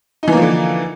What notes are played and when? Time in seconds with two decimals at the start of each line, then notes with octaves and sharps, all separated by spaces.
0.23 D#4
0.28 E3
0.32 A#3
0.37 F3
0.42 D3